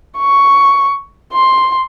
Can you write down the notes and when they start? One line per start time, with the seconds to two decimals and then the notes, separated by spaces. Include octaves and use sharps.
0.18 C#6
1.33 C6